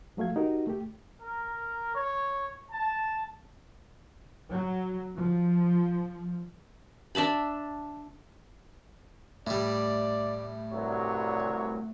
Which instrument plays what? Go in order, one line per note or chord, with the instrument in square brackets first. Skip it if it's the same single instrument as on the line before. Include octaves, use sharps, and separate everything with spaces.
[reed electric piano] F3 F#3 A3 F5 G#6
D#4 F#4 G4 A#4
A3 G4
[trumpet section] A#4
C#5
A5
[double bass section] F#3
F3
[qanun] D4 E5 A5 B5
[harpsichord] A2 G3 [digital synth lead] A3 [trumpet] D5
[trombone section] C2 G2 F#3 [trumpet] C#5